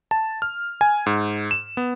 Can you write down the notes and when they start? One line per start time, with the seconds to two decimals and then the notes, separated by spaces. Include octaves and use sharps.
0.11 A5
0.42 F6
0.81 G#5
1.06 G#2
1.51 E7
1.77 B3